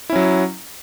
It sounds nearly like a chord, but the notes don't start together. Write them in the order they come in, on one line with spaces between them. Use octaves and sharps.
E4 C#4 F#3